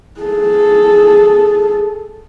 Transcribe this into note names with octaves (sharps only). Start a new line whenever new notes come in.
G#4 A4